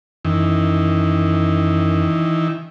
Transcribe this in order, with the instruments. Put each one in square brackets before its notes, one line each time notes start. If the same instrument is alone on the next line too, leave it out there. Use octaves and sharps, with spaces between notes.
[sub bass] F#2 [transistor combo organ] D#3 E3